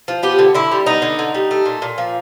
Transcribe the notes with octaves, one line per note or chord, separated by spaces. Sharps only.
F3
B3 G4
D3
D3 E4
G3
B3 D#4
D3
D3
G3
A3
A#2
A#2
F3